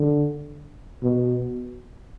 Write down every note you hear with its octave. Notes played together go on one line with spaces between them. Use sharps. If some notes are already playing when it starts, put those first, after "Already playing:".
Already playing: D3
B2